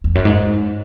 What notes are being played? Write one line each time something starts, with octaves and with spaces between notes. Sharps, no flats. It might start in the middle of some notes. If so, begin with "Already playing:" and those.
E2
F#2
G#2